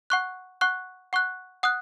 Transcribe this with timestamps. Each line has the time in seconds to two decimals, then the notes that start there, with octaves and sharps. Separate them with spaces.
0.10 F#5 C#6 F#6
0.61 F#5 C#6 F#6
1.13 F#5 C#6 F#6
1.63 F#5 D#6 F#6